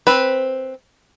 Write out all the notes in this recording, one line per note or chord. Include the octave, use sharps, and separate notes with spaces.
C4 B4